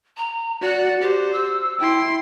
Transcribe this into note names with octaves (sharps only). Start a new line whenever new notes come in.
A#5
F#4 D5 F#5
G4 C5
E6
E4 G5 C6